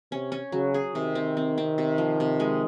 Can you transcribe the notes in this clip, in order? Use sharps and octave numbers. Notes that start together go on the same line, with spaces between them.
C3 C#4
C#4
C#3 F#3
G#4
C3 D#3
C4
C4
C4
C3
F3
C3
G#3